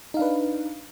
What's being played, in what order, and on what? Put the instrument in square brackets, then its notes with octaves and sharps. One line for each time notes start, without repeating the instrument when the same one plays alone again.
[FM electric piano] D#4
F5
D4
B4